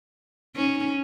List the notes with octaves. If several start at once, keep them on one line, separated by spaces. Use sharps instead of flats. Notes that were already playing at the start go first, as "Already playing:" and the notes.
C#4 D#4